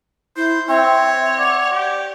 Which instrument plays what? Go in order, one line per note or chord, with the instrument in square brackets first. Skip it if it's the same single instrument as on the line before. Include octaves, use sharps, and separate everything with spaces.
[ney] E4 [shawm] C5
[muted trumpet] C4 [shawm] C#5 [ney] E5
[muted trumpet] D5 [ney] F#5
[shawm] G4